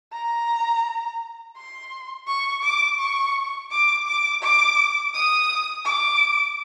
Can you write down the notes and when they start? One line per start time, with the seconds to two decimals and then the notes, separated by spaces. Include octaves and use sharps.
0.13 A#5
1.57 C6
2.27 C#6
2.63 D6
2.99 C#6
3.71 D6
4.07 D6
4.43 D6
5.14 D#6
5.85 D6